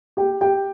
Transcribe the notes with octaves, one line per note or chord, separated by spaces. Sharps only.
G4 G5
G4 G5